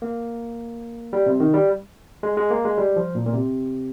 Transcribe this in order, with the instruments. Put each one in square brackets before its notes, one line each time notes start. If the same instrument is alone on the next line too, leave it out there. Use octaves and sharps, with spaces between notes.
[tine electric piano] A#3
G3
C3
D#3
G3
G#3
G#3
A#3
G#3
G3
F3
A#2
A#2
C3